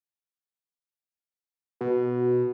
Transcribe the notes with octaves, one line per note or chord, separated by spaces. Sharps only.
B2